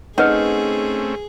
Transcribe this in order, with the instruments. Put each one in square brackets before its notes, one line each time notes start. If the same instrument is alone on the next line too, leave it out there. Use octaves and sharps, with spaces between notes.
[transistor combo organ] A3 C4 C#4 [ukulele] D#4 [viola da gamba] G#4 [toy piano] B4 F#5